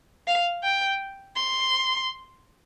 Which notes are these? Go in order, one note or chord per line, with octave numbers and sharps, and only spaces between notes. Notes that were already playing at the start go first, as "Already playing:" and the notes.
F5
G5
C6